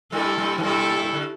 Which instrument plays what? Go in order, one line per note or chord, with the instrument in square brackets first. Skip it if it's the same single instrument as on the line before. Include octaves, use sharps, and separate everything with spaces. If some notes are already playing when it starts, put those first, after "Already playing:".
[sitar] G2 G3 [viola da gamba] E4 A4
[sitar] G2 G3
E3
[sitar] G2 G3 [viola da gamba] E4 A4
[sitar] D3